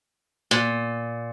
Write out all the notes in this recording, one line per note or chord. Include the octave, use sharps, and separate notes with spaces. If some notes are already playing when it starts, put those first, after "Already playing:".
A#2